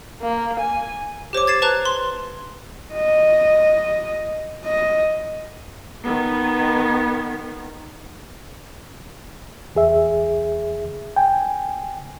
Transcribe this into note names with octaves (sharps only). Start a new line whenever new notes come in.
A#3
G#5
G4 C5 C#5 D6
G#6 A6 C7 E7
B4 C5 A5 A#5 F#6
C6
D#5
D#5
D#3 B3
E2 G#4 E5
G5 G#5